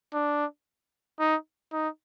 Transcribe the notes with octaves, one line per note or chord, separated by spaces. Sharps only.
D4
D#4
D#4